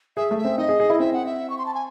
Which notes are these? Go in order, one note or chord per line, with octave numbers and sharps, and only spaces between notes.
G#4 E5
A3
E5
C4
D#4 D#5
G#4
G#4
E4
C4 E5
F#5
E5
C#6
C6
A5
G#5